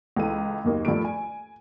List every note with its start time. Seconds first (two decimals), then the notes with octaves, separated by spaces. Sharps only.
0.17 C#2 E3 A4 D#7
0.64 F#1 D#2 A#3 D#4
0.85 G2 F3 A3 D7
1.05 G#5